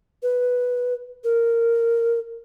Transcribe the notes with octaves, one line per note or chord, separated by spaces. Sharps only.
B4
A#4